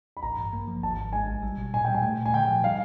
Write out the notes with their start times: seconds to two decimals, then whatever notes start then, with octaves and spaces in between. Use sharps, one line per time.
0.17 B5
0.23 A1 A#5
0.38 G2
0.53 A#3
0.68 F3
0.83 G#1 A5
0.99 G#1
1.13 G#3 G#5
1.28 A#1
1.43 G3
1.58 B2
1.74 A#2 G#5
1.85 G3 G5
1.94 G#5
2.03 A3
2.19 A#2
2.26 G#5
2.33 D3 G5
2.48 F3
2.63 G3 F5